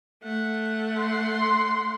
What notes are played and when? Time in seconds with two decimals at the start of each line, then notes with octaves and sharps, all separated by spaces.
0.23 A3 F#5
0.99 C6